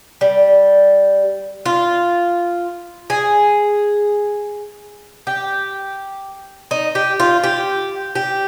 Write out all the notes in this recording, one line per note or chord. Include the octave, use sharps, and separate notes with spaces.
G3
F4
G#4
G4
D#4
G4
F4
G4
G4